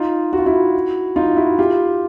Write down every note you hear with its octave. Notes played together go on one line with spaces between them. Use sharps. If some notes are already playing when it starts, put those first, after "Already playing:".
Already playing: D#4 F4
F#4
F4
E4 F#4
D#4 F4
E4 F#4
F4 G4